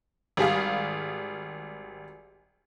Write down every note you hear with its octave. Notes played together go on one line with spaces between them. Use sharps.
G#1 G3 G#4 F5